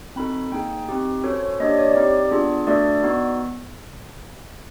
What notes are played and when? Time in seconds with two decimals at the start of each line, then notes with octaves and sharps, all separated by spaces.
0.16 C4 D#4 F#4 A4 B5
0.52 A#3 D#4 G#4 G5
0.89 C4 D#4 G4
1.23 C#4 F#4 A4 C#5
1.32 C5
1.40 C#5
1.60 A#3 D4 G4 D#5
1.69 D5
1.78 C#5
1.88 D5
1.95 C4 D#4 G4
2.31 B3 D4 F4 G#4
2.67 A3 D4 F#4 A4 D5
3.03 B3 D#4 F#4